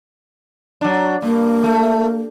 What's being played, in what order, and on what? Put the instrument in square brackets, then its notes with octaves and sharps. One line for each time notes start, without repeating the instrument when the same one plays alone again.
[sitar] F#3 D4
[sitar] G2 [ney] A#3
[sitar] A3